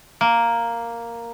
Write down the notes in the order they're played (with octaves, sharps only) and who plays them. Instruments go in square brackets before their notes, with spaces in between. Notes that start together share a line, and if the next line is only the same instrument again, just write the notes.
[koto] A#3